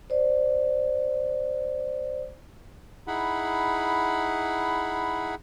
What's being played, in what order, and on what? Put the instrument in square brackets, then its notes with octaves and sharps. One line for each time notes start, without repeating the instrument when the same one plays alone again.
[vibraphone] C5 D5
[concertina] D#4 E4 G#4 F#5 B5